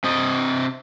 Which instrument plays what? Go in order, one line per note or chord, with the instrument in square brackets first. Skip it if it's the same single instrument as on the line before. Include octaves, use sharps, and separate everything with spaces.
[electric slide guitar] C3 C4 D#5